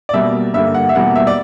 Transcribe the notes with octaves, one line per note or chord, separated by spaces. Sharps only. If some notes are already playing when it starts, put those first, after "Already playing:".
D5
B2 G3 A#3 E5
G2 D3 G3 A#3 E5
F#5
E5
E2 B2 G3 A#3 F#5
E5
D5